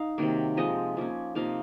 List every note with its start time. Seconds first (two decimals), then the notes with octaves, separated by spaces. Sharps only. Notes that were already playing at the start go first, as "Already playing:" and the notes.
Already playing: D#4 F5
0.18 C3 D#3 F#3 A#3
0.57 F3 G#3 D#4 D#5
0.97 F3 A#3 C#4
1.35 C3 F3 A#3 D#4 F5